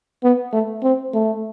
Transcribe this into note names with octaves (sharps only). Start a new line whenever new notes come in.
B3
A3
C4
A3